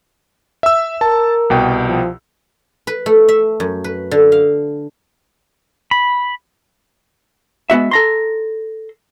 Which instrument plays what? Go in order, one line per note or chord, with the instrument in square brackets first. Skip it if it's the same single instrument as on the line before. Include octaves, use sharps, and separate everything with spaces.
[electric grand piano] E5 E6
[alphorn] A#4 [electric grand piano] A5
[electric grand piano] C2 B2 G5
[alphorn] F3
[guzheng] B4
A3
E5
F#2
B4
D3
F5
[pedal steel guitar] B5
[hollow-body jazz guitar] G#3 B3 F#4 E5
A4 A#5 C6